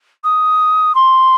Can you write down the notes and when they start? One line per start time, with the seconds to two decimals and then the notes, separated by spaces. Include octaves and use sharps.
0.24 D#6
0.95 C6